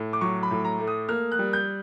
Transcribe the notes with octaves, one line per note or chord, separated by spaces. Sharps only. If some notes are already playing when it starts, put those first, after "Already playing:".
Already playing: A2
D6
F#3 C#6
B5
A2
A#5
A3
D#6
A#3 F6
F#6
G3
G6